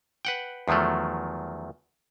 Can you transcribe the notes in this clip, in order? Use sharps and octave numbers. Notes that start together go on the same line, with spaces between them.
B4 F#5 G5
E2 D#3 F3 F#3 A3